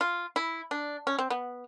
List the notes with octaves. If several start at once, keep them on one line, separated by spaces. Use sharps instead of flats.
F4
E4
D4
C#4
C4
B3